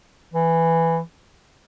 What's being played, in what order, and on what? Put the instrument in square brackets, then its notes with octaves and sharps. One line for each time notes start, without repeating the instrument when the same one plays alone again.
[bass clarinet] E3